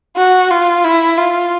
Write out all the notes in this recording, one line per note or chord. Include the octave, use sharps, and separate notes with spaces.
F#4
F4
E4
F4